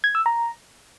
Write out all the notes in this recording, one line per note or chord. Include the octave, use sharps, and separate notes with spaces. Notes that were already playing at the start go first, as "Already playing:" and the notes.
G#6
E6
A#5